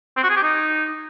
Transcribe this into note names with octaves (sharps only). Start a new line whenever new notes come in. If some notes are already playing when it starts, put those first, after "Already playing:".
C4
F#4
G#4
G4
D#4